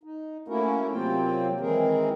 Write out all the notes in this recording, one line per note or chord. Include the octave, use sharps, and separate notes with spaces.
D#4
A3 A#3 C#4 E4 F#4 A#4
C3 F#3 A#3 C4 F4 G5
D#3 E3 G#3 C4 G#4 A#4